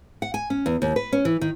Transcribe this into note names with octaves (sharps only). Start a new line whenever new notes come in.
F#5
G#5
C#4
E2
D#2
B4
C#4
E3
D#3